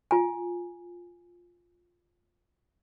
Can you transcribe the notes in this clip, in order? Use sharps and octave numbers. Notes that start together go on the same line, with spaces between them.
F4 G#5